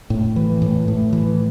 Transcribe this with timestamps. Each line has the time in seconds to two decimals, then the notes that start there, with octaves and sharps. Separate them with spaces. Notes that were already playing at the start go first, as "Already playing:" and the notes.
0.10 A2
0.36 E3
0.62 A2
0.88 A2
1.13 E3